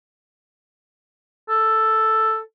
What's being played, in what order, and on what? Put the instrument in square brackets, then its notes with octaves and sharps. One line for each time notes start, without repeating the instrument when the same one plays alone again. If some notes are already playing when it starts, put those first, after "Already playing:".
[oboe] A4